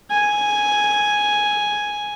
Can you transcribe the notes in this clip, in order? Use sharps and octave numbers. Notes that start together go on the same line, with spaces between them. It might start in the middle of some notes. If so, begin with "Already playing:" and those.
G#5